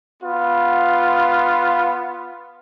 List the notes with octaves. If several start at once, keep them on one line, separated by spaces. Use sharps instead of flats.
B3 F4